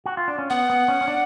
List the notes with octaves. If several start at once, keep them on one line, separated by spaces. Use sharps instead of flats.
F#4
F4
D4
C#4
B3 F#5
B3
C#4
C#4
D4